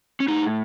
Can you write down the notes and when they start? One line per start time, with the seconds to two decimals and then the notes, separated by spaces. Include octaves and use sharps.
0.20 C#4
0.28 A2 D#4